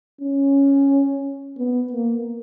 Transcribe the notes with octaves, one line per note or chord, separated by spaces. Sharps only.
C#4
B3
A#3